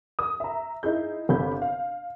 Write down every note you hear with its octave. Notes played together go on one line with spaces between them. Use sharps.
D#6
E5 A#5
D#4 E4 G#4 G6
G1 C3 B5 G6
F5